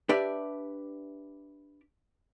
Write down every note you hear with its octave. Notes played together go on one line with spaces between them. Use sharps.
D4 G4 B4 D5 E5